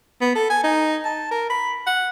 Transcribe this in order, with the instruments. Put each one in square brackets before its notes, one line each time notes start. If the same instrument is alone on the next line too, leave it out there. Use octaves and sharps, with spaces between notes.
[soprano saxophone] B3
A4
G#5
D#4
A5
A#4
B5
F#5